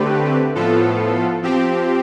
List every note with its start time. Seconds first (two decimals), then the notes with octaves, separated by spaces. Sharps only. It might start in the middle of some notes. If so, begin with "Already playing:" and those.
Already playing: D3 A3 C4 G4 B4
0.55 A2 F3 B3 F4 A4
1.42 F3 C4 G4